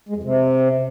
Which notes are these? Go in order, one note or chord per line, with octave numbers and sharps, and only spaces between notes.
G#3
F2
C3